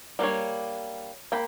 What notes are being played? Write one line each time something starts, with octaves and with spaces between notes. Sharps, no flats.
G3 A#3 D4 C#5
A#3 G5 B5